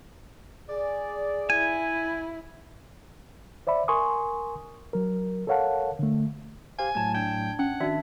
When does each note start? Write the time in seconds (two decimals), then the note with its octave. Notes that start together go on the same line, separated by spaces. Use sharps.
0.69 G#4 D5
1.50 E4 G#5
3.67 C5 D5 E5 B5
3.88 A#4 G#5 C6 C#6 D#6
4.93 F#3 A#4
5.47 A4 A#4 C#5 F5 F#5 A5
5.99 D3 A3
6.79 G4 C5 F5 G#5
6.95 A2 F#3 A3 A5 G#6
7.14 D4 G5 G#6
7.59 C#4 F#5
7.80 D#3 D4 F#4 D5 E5